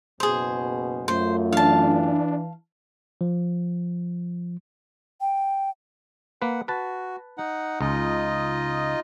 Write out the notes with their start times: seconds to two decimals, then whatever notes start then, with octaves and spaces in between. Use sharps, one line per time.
0.20 F#1 B2 G#4 C5
1.08 F#2 A3 F4 C5
1.52 E3 D4 F5 A5
3.21 F3
5.21 G5
6.42 A#3 B4 F#5
6.68 F#4 B4 A5
7.38 D#4 F#5
7.81 C#2 D#4 F4 D#5